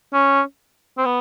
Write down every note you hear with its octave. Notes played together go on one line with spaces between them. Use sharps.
C#4
C4
B3